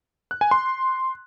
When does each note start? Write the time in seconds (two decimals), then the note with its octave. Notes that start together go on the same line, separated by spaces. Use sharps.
0.31 F#6
0.41 G#5
0.51 C6